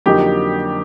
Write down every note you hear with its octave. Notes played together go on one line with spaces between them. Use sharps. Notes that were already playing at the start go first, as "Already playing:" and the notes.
F2 D3 F#3 A#3 D#4 G4